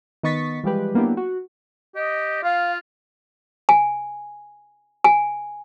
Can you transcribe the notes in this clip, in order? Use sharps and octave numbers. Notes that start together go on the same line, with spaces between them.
D#3 B3 D#5 C#6 A6 B6
E3 F3 G3 G#3 G4 B4
F#3 A#3 B3 D4 E4 G4
F#4
G4 D#5
F4 F5
G#5
G#5